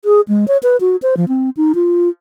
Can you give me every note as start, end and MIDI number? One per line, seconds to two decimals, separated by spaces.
0.05 0.21 68
0.28 0.48 56
0.48 0.57 73
0.63 0.77 71
0.81 0.96 66
1.02 1.15 72
1.17 1.25 53
1.28 1.50 60
1.57 1.72 63
1.75 2.09 65